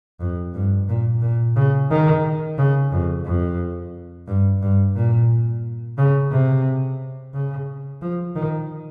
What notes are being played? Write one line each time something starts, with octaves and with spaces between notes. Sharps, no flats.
F2
G2
A#2
A#2
C#3
D#3
C#3
F2
F2
G2
G2
A#2
C#3
C3
C#3
F3
D#3